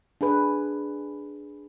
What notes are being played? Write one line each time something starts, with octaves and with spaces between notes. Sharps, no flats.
D4 G#4 B4